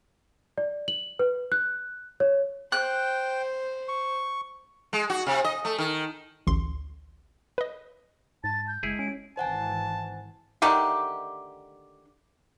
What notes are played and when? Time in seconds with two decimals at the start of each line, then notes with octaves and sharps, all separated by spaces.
0.58 D5
0.88 F#7
1.19 B4
1.52 F#6
2.20 C#5
2.72 C5 G5 F#6
3.88 C#6
4.93 G#3
5.10 F#4
5.27 C3
5.44 D#5
5.65 A3
5.78 D#3
6.47 A1 D2 C6
7.58 B4 D#5
8.44 G#2 A5 A6
8.68 G6
8.83 F#1 G#3 E4 G#4
8.99 C#4 D7
9.37 G#1 E3 C5 F#5 G#5 A5
10.62 D3 D#3 A3 G4